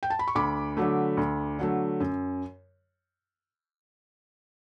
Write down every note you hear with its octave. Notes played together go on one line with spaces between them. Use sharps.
G5
A5
B5
C#6
D2 B5 D6
D3 F#3 A3
D2
D3 F#3 A3
F#2